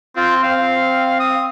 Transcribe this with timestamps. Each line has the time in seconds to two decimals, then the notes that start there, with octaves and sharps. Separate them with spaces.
0.16 C4 F4
0.43 C4 F5
1.20 D#6